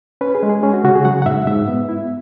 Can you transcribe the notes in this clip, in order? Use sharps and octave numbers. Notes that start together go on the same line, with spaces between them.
C#4 B4
G#4
G#3
G#4
C#4 G#4
F#4
C#3 F#4
G#4
F#3 F#5
F#5
G#2 E5
G#2 E5
B3
E4